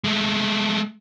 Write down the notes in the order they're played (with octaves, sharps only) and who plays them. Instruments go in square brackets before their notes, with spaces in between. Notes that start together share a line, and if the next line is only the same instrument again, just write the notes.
[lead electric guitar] G#3 A3